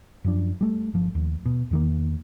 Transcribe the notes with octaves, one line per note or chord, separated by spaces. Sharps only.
F#2 F3 D4
G3 A3
G1 F3
D#2
B2
E2 D#3 A#3